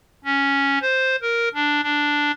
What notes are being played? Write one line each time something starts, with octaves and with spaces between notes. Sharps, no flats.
C#4
C5
A#4
D4
D4